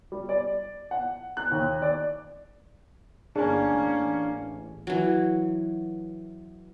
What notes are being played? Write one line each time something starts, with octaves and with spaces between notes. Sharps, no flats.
G3
D5
F#5
F#6
D#2
D5
G1 A#3 C#4 D4 G#4 G#5
A1
E3 F#3